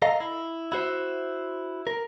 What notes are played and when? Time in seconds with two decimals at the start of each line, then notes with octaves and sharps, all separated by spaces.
0.02 A4 D#5 F5 A#5
0.20 E4
0.72 E4 F#4 C5 E5
1.87 A#4